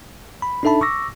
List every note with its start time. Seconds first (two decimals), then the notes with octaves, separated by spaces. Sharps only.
0.42 B5
0.63 D4 D#4 A4 E5 A5 B5
0.81 C#6 D6 E6 A#6